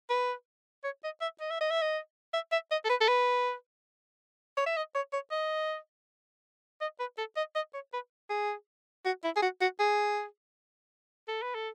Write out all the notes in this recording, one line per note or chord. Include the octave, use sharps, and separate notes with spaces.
B4
C#5
D#5
E5
D#5
E5
D#5
E5
D#5
E5
E5
D#5
A4
B4
A4
B4
C#5
E5
D#5
C#5
C#5
D#5
D#5
B4
A4
D#5
D#5
C#5
B4
G#4
F#4
E4
G#4
F#4
F#4
G#4
A4
B4
A4